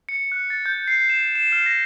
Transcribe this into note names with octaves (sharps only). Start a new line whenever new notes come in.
C#7
F#6
A6
G6
C7
E7
E7
F6
A#6